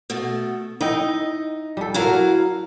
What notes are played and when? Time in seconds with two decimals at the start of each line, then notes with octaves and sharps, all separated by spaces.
0.10 B2 A3
0.81 D#4 E4 D#5 G5
1.77 G3 A4
1.94 F#3 E4 F#4 A#4 F5